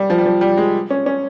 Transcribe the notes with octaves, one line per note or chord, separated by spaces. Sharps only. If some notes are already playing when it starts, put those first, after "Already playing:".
Already playing: G3
F3
G3
F3
G3
G#3
C#4
C#4